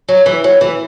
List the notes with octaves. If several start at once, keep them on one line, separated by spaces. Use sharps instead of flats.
F#3
E3
F#3
E3